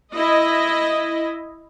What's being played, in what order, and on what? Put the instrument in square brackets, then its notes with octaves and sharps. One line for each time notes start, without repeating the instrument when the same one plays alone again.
[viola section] E4 D#5